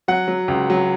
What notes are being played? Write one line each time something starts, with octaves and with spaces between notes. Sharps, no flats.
F#3 F#5
F#3
C#2
F#3